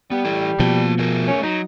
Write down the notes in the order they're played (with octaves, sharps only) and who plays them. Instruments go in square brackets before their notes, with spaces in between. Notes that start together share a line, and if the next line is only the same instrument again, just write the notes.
[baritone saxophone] G3 [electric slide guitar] B3
[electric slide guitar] E3 E4 A4
[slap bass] B2 F3 [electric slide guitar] A#3 A5
[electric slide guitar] A3 G#4 A#4
[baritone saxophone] C#4
[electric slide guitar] F#3 [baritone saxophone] D#4